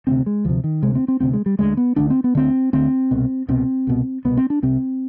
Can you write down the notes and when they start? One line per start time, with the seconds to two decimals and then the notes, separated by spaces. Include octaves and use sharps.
0.07 D2 C3 C4
0.26 G#3
0.45 D2 C3 F3
0.64 D#3
0.82 D2 C3 G#3
0.95 C4
1.08 C4
1.20 D2 C3 C4
1.33 G#3
1.46 G3
1.59 D2 D3 G#3
1.77 B3
1.96 D2 D3 D4
2.10 C4
2.24 B3
2.35 D2 D3 C4
2.73 D2 D3 C4
3.11 C2 B2
3.48 C2 B2 C4
3.87 C2 B2
4.25 C2 B2 B3
4.37 C4
4.50 D4
4.63 C2 C3 C4